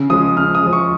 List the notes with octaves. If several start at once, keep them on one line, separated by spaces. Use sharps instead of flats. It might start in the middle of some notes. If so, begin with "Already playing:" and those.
Already playing: C#3
F3 G#3 D#6
C#3 F6
D#6
F3 G#3
C#6